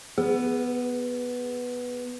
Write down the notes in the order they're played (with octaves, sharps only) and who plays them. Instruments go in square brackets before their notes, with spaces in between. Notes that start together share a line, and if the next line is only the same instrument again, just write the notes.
[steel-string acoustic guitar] B3 [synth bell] G#4